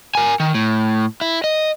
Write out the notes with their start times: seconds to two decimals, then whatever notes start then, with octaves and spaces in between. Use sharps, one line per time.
0.15 A#4 G#5
0.40 D#3
0.54 A2
1.21 E4
1.44 D#5